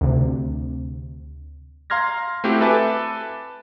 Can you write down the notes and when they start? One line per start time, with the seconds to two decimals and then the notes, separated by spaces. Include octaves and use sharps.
0.01 D2 C3
1.90 F5 A#5 C6 F6 G#6 A#6
2.44 A3 C4 E4 F#4 G4
2.61 A4 B4 E5 G#5 A5 D6